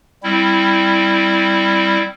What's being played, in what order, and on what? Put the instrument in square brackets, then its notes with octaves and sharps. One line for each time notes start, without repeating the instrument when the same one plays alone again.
[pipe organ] G3 C4 E4